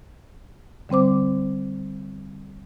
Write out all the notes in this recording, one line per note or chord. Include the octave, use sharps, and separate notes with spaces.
D3 G3 C4 C5 D6